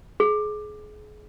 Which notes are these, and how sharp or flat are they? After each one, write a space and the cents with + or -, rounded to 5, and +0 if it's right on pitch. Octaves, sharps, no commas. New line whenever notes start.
G#4 +30